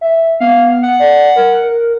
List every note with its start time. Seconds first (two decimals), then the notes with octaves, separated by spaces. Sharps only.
0.01 E5
0.41 B3 F5
0.83 F#5
0.99 D5
1.36 A#4
1.63 A#4